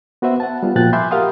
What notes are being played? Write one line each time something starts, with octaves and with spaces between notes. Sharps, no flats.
B3 F#4 B4 C5 E5 F#5
F#5 A5
G3 B3 F4
A#2 F3 F#4 G5 F#6 A6
E5 G#5 B5 C6 D6 G6
G4 A#4 F5 F#5 C6 D#6